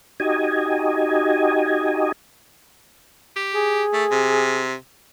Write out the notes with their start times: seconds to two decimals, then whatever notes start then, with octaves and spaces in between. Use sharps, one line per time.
0.20 D#4 F#4 G4 D#5 G#5
3.36 G4
3.55 G#4
3.93 A3
4.11 C3